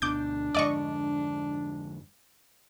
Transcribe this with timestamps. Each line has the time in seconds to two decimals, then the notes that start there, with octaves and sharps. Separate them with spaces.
0.02 D2 B2 D3 D4 D6 G6
0.55 F2 G#2 D3 D5 D#5 C#6